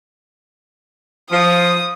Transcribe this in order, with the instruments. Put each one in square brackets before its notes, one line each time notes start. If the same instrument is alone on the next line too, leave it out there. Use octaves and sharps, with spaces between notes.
[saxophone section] F3 [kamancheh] D#6